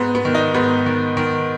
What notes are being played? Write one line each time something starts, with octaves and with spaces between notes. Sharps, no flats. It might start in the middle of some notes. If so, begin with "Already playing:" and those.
Already playing: G#2 B3
B3
D#3
D#4
G#2 B3
D#3
D#3